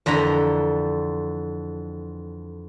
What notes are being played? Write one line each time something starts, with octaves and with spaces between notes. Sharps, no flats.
F2 D3 E3 A#5 B5